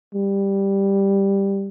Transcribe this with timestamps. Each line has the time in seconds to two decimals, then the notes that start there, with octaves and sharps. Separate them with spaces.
0.14 G3